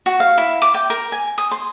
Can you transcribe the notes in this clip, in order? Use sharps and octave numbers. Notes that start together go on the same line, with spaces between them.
F#4
F5
E4
D6
G5
A#4
G#5
D#6
C6